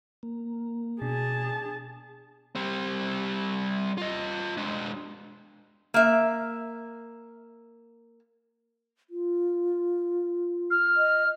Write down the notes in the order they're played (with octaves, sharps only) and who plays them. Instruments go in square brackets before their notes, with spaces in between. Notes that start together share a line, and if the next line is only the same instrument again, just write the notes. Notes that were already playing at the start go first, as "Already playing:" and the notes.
[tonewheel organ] A#3
[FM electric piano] B2 [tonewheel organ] D4 [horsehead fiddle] G#4 A5
[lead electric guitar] G3 C4
F4 D#5
G#3 D4
[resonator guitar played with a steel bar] A#3 E5
[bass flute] F4
[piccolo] F6
[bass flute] D#5